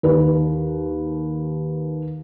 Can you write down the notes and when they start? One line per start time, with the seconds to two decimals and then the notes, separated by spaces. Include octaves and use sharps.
0.03 D#2 B4